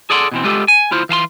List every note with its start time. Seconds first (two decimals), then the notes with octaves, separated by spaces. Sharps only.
0.10 G#4 A4 D5 F#5 C6
0.32 B2 E3 C4
0.44 G3 G#3 B3 F4 G4 A4
0.68 G#5
0.91 D2 E4 F4 C5
1.09 E3 F5 A5 C6